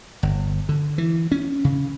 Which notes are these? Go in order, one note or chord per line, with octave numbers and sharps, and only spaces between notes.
G1
D3
E3
C#4
C#3